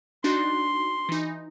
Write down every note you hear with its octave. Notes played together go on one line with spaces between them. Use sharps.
D4 D#4 F#4 C6
E3 D#4